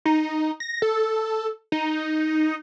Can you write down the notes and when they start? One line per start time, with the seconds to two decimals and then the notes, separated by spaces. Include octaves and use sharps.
0.05 D#4
0.60 A#6
0.82 A4
1.72 D#4